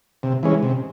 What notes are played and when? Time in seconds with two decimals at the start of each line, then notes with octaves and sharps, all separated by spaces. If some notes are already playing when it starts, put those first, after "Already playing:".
0.23 C3
0.43 E3 G#3 C#4
0.63 C3